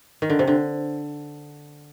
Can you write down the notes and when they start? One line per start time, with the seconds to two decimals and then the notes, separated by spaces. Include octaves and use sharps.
0.22 D#3
0.30 D3
0.39 C3
0.47 D3